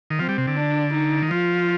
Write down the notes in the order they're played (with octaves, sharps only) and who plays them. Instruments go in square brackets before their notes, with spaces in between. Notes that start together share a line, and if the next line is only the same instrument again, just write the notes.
[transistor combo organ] D#3
[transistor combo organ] F3 [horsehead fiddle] C4
[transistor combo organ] G3
C3
D3
[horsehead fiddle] D4
D#4
[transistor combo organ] D#3
[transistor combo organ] F3 [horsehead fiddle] F4